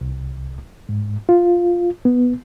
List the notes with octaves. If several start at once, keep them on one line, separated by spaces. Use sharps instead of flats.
C2
G#2
F4
B3